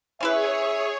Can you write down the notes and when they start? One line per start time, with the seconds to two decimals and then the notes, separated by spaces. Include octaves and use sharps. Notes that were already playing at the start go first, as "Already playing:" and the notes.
0.21 C#4 E4 G#4 B4 C#5 E5